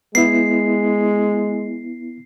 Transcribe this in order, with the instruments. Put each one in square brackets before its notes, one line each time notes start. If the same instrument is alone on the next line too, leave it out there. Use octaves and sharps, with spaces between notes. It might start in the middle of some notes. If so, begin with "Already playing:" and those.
[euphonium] G#3 [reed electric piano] B3 E4 [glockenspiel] C7